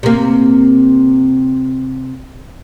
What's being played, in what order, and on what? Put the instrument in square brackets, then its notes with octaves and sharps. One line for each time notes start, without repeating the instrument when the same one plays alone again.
[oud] C3 A#3